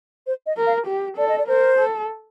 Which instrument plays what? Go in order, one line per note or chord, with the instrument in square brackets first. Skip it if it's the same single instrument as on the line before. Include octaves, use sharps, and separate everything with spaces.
[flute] C5
D#5
[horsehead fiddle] A#4
[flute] F5
[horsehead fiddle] G4
[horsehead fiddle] A4 [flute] D5
[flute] D#5
D5
[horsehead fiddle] A#4 [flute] C5
[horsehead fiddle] A4